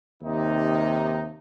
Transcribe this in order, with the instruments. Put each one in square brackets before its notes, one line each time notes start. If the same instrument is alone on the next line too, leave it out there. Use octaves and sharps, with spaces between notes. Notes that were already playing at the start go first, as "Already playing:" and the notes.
[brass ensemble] D#2 C3 D#4